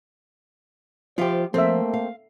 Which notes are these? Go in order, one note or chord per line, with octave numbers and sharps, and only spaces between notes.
F3 F4 G4 C5 E5 F5
F3 A3 A#3 C4 A4 E5
F5